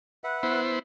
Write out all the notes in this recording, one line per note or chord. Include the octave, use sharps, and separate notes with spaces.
B4 E5 F#5
B3 E4 C5